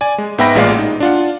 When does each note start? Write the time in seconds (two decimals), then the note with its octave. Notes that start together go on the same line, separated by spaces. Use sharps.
0.01 D5 G#5
0.18 G#3
0.38 G#2 B3 E5 G5 B5 A#6
0.55 A1 A#2 G#3 D5 F5
0.79 D#4
1.00 D4 F4 F#5